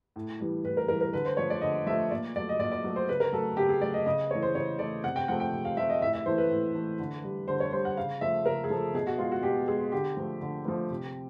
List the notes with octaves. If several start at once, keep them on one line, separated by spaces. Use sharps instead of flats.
A2
E3 G3
A2 B4
A#4
E3 G3 A#4
A#4
D3 B4
C5
F3 A3 C#5
D5
D3 D#5
F3 A3 E5
A#2 D5
F#3 A3 D5
D#5
A#2 D5
D5
F#3 A3
C5
C#3 B4
A#4
F#3 A3 A4
C#3 G4
G#4
F#3 A3 D5
D#5
C#3 D#5
E3 A3 C#5
C5
C#3 C#5
E3 A3 D5
C3 F#5
G5
F3 A3 F#5
G5
C3
F5
F3 A3 E5
D#5
A2 E5
E5
E3 A3 C5
B4
A2
E3 A3
D3
G3
D3 C5
C#5
G3 C5
F#5
C#3 F5
F3 A3 E5
C#3 A#4
G#4
F3 A3 A4
B2 G#4
F#4
G#3 F4
F#4
B2 G4
G#3 G#4
D3 G4
F3 A3
D3
F3 A3
C3